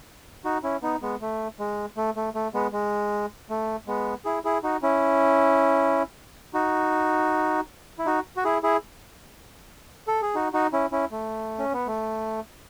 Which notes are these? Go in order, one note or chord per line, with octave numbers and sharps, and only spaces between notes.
D#4 F#4
C#4 E4
B3 D#4
G#3 B3
A3
G#3
A3
A3
A3
G#3 B3
G#3
A3
G#3 B3
E4 G#4
E4 G#4
D#4 F#4
C#4 E4
D#4 F#4
E4
D#4 F#4
F#4
E4 G#4
E4 G#4
A4
G#4
D#4 F#4
D#4 F#4
C#4 E4
C#4 E4
A3
C#4
B3
A3